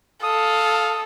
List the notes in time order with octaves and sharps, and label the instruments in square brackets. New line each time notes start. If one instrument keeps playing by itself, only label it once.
[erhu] A4 [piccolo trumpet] F5 [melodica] D#6